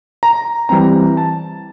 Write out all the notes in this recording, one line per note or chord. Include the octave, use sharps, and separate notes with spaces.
A#5
E3 G3 C4 A#5
A5